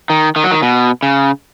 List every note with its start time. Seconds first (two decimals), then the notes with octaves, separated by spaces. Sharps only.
0.10 D#3
0.36 D#3
0.44 F#3
0.51 D#3
0.62 B2
1.03 C#3